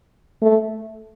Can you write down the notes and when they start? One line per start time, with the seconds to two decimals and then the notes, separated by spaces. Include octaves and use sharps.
0.42 A3